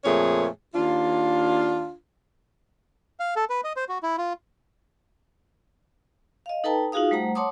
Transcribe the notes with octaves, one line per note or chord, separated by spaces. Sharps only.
F2 A#2 A3 G#4 C#5
D#2 D4 F4
F5
A4
B4
D#5
C5
F#4
E4
F4
D#5 F5
D#4 A4 B4 G5 A5 A#5
D#4 F4 F#4 G#4 F5 D#6
G3 A3 C5 F#5 A#5
C#5 F#5 A5 C6 D6 D#6